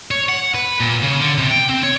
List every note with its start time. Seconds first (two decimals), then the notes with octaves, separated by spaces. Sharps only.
0.11 C#5
0.29 F#5
0.55 B4
0.80 A#2
1.03 C#3
1.19 D3
1.38 C3
1.51 G5
1.69 C4
1.83 C#5